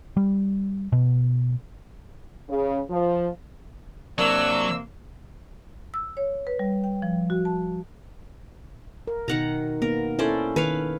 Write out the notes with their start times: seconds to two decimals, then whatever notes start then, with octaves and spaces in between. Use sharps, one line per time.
0.17 G3
0.92 B2
2.49 C#3
2.90 F3
4.18 C3 F#3 A#3 D4 E6
5.94 E6
6.17 C#5
6.47 B4
6.59 G3
6.84 G5
7.02 F3
7.30 F#4
7.45 A5
9.07 A#4
9.28 B2 D#3 F#5 A#5
9.82 A#3 B3 A#4
10.19 C#4 E4 A4 C5 D5
10.56 D#3 B4 C#5 F5